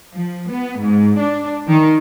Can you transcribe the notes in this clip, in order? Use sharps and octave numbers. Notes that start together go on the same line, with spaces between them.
F3
B3
G#2
D4
D#3